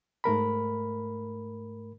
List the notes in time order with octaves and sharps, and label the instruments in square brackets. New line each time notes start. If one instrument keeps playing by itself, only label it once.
[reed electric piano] G#2 A3 A#4 B5